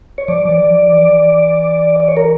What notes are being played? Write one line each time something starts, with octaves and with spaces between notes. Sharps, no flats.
C#5
F3 D5
F3
E3
F3
E3
D5
C#5
A#4